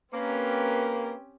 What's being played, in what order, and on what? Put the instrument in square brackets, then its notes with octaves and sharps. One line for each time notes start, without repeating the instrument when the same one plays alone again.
[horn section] A#3 [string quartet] C4 C#4 G4 [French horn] B4